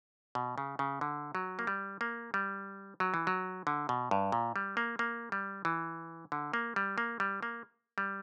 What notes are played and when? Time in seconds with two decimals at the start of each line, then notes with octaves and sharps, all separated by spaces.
0.35 B2
0.58 C#3
0.79 C#3
1.01 D3
1.35 F#3
1.59 A#3
1.67 G3
2.01 A#3
2.34 G3
3.00 F#3
3.14 E3
3.27 F#3
3.67 D3
3.89 B2
4.11 G2
4.32 A#2
4.56 G3
4.77 A#3
4.99 A#3
5.32 G3
5.65 E3
6.32 D3
6.54 A#3
6.76 G3
6.98 A#3
7.20 G3
7.43 A#3
7.98 G3